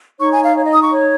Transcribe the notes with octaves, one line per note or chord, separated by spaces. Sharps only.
D#4 C#5 C#6
G#5
F5
C#5
D#5
D#6
C#6
C#5